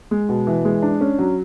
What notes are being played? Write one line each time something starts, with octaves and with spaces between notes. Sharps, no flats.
G#3
B2
E3
G#3
D4
C#4
F#3